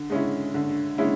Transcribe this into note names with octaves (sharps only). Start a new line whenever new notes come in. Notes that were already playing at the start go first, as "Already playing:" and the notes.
Already playing: D3
G#3 C#4 E4
D3
G#3 C#4 E4